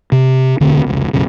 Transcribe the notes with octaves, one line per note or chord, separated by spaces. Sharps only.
C3
E1 D2 D3 C4
F1 C#2
F#1 B1 C#3